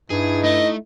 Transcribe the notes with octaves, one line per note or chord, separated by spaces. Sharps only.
G2 D#4 E4 G#4
A3 D#5